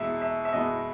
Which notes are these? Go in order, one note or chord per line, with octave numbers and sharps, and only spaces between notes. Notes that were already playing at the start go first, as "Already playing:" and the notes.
Already playing: E2 B2 G#3 B3 E5
E5
E5
E2 B2 G#3 B3 D#5